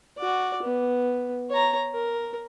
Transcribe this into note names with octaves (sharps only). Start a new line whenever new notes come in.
F#4 D5
B3
C#5 A#5
A#4